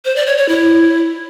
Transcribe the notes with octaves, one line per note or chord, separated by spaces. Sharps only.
C5
D5
C#5
C#5
E4